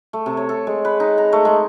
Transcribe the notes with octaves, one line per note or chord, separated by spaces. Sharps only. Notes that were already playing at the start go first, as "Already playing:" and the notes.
A3
C3
C#5
A4
G#3
B4
D#4
A#5
A3
G#3